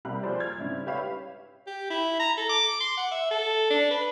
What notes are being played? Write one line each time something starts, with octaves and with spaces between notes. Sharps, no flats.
C3 G3 G4 A#4 B5 F#6
F3 A#3 G#4 C5 D5
F6 G#6
G#2 C#3 G3 C4 D4 E4
G4 B4 C#5 E5 F5 B5
G4
E4
A#5
A4
D6
C6
F#5
E5
A4
D4
B4